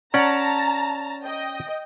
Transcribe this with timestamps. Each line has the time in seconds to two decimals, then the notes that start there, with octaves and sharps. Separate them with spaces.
0.14 C#4 D5 F#5 A5 A#5
1.23 D#5 G5